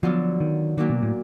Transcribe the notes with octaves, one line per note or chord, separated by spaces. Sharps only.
D3 F3 F#3 B3 D4 F4
D#3
A#2 D#3 F#3 A#3 D4 F#4
B2
A2